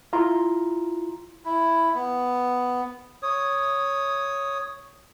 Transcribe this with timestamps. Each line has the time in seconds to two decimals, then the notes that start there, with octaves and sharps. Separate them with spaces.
0.13 E4 F4 A#5 C6
1.45 E4
1.94 B3
3.23 C#5 D#6